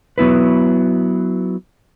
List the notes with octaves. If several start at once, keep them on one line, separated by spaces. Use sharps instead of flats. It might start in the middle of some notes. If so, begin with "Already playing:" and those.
F#3 B3 E4 B4